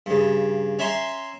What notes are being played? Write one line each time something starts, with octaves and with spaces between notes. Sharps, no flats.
G2 C#3
C#4 C#5 E5 A#5 C6